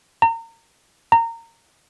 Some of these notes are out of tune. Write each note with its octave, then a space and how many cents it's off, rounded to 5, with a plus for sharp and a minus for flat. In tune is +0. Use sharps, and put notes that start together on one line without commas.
A#5 -30
A#5 -20